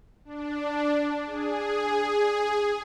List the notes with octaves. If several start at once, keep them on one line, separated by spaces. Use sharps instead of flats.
D4
G#4